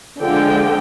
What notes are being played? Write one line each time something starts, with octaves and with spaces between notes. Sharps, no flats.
D3 F3 G#3 G5